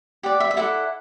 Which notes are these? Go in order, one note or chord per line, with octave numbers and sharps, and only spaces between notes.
G4 D5 F#5
E5
E5
E4 A4 D5 F#5